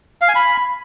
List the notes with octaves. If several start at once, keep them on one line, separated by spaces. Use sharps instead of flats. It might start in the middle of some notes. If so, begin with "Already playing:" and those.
F5
G#5
B5